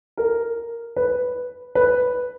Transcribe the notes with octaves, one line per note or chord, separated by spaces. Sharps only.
A#4
B4
B4